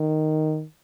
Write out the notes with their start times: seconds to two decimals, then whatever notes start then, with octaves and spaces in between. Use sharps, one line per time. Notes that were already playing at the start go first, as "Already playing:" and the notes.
Already playing: D#3